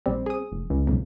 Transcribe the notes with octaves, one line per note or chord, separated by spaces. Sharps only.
A#1 G3 C4
G#4 D#6
F1
C#2
B1 F2